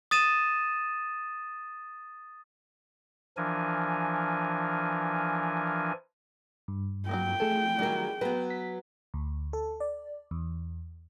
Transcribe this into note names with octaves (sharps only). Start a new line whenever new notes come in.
D#6 A6 D#7 E7
E3 F3 D4 A#4 G#5
G2
F#3 A3 A#3 G5
A3 G#4 A4
D#3 F#3 G3 E4 A#4
F#3 B3 B4
B6
D2
A4
D5
E2